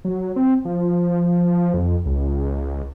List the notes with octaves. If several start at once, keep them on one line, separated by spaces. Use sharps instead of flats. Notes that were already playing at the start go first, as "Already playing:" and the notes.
F#3
C4
F3
F2
C#2